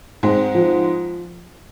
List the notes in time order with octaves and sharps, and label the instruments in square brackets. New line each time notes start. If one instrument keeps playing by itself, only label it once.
[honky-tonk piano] G#2 G#3 [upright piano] C4
[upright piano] F3